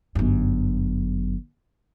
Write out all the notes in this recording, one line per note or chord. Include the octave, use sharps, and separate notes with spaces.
G1 F#2